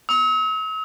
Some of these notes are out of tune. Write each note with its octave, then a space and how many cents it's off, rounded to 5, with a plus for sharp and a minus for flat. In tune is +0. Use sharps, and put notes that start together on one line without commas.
E6 -45